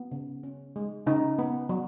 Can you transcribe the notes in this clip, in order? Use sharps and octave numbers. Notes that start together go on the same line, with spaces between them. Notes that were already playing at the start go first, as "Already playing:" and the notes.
Already playing: B3
C#3
C#4
G#3
C#3 D#4
B3
F#3